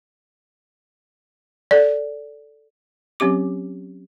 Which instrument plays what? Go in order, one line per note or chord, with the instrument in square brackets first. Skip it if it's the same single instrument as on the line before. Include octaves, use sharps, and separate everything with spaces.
[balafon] A4 D5
F#3 C4 C#4 G4 D6